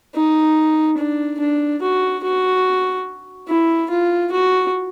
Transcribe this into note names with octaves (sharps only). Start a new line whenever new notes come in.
D#4
D4
D4
F#4
F#4
E4
F4
F#4